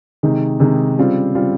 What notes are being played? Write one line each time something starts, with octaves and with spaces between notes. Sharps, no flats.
C3 D#3 G#3 D#4
C3 D#3 G#3 D#4
C#3 G3 C4 F4
C#3 G3 C4 F4